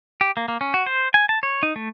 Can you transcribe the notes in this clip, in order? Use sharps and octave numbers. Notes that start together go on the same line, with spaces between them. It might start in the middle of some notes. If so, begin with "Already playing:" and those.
G4
A#3
A#3
C#4
F#4
C5
G#5
A5
C#5
D#4
A3